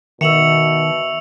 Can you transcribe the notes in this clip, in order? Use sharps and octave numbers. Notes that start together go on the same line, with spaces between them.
B2 D#3 E5 C#6 E6 C#7 F7 F#7